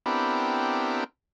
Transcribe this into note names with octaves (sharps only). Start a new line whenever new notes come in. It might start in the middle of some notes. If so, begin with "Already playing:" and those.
B3 C4 D4 E4 G4 A#4